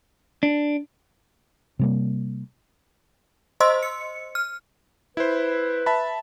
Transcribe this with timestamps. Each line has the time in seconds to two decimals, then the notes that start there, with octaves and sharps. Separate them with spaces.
0.43 D4
1.79 C3 G3 A#3
3.60 C5 D#5 C6 E6
3.83 C#7
4.35 F6
5.17 E4 B4 C5
5.86 E5 A5 B5